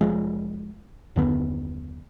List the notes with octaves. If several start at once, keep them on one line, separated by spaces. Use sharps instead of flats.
F1 D#2 F3 G#3
F#1 D#2 D3 B3